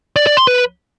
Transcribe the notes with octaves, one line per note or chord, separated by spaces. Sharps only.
D5
D5
C6
B4